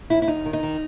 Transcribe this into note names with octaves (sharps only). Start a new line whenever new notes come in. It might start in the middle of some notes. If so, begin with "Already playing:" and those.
D#2 E4
E4
D#2 D#4
D#3
D#4
D#3